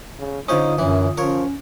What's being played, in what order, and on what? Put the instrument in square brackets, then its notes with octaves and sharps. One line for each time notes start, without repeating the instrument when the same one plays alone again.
[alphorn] C#3
[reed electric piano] D3 F4 D#6 [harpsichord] C#4 C5 F5 [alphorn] D#4
[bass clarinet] F#2 [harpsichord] E3 [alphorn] C#4
[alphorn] F3 [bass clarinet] C#4 [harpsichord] A#4 C#5